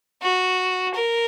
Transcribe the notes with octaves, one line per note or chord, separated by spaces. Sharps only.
F#4
A#4